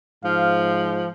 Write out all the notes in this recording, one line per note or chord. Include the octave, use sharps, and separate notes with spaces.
G#2 F3 F5